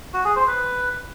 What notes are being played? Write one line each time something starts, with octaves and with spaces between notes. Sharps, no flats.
F#4
G#4
C5
B4